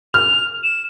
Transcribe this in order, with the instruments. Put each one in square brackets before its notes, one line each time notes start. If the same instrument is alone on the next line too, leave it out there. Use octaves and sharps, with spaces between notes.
[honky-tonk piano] F6 [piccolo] F7
[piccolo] E7